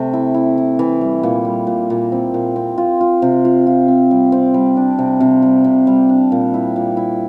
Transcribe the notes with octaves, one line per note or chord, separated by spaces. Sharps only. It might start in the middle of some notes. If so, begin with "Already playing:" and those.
Already playing: C3 A3
E4
E4
E4
E3
G3
A#2
G3
A#2
A#2
C4
A#2
C4
F4
F4
C3
F4
F4
C4
G3
C4
G3
D4
C3
C3
G3
C3
G3
D4
A#2
E4
A#2
E4